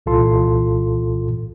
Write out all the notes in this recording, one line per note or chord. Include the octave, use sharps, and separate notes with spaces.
C2 A#2 E3 F4 A4 C6